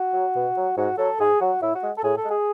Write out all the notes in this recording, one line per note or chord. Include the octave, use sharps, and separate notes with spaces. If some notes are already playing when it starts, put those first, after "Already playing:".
Already playing: F#4
F#3
B2
F#3
G#2 F#4
F#3 A4
G#2 G#4
F#3 F#4
A2 E4
F#4
G#3
A4
A2 G#4
A4
G#3
G#4